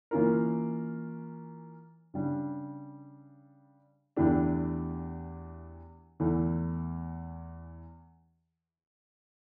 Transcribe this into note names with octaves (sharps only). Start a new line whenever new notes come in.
E3 A#3 C#4 F4 A#4
C#3 G3 D4
E2 E3 A3 D4 G4
E2 E3 A3